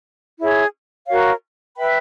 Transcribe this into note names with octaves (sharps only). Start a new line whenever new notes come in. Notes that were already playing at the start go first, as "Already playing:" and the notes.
E4 G#4 C#5
F#4 A#4 C#5 F5
B4 E5 G5 B5